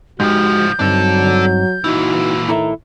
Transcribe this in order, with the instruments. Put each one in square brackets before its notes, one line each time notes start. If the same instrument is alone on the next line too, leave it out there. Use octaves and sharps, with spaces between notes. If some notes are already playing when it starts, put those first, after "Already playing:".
[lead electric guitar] G#2 F3 [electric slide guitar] G#3 D#4 G4 [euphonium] F#4 [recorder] G6
[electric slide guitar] G2 C4 D#4 [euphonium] F#3 [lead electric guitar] D4 A4
[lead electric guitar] A#2 E3 [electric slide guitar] D#4 E4 [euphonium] F#4
[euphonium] D#3 [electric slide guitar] E4 A4 E5 [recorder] A#5